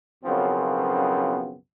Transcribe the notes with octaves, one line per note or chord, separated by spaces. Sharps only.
B1 F#2 C#3 F3 B3 C4